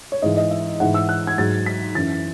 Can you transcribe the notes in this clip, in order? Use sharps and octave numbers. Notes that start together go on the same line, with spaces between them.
C#5
G#2 E3 D#5
D#5
E5
G#2 E3 F#5
E6
F#6
G#6
G#2 F#3 A6
B6
F#2 E3 A6